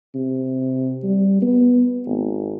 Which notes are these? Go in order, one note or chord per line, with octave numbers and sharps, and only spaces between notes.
C3
G3
B3
G#1